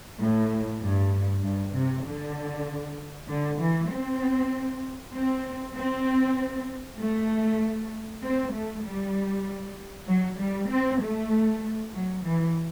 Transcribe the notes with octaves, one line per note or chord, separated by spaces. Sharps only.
A2
G2
G2
C3
D3
D3
E3
C4
C4
C4
A3
C4
A3
G3
F#3
G3
C4
A3
F#3
E3